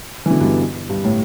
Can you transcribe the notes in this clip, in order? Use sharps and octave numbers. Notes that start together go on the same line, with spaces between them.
E3
B2 D3
G2 B2
G2
A2